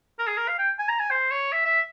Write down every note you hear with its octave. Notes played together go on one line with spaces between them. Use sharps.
A#4
G#4
A#4
F5
G5
G#5
A#5
G#5
C5
C#5
E5
E5